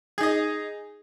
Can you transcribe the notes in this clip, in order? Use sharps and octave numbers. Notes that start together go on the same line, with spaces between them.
D#4 G#4 D#5